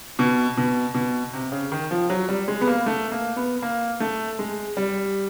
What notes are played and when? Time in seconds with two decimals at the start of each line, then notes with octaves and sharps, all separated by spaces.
0.19 B2
0.57 B2
0.94 B2
1.34 C3
1.52 C#3
1.72 D#3
1.91 F3
2.10 F#3
2.29 G3
2.48 G#3
2.61 B3
2.67 A#3
2.86 A3
3.12 A#3
3.36 B3
3.62 A#3
4.00 A3
4.39 G#3
4.77 G3